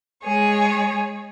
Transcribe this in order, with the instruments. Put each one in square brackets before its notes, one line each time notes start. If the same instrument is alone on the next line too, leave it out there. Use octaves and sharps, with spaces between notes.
[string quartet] G#3 G#4 C#5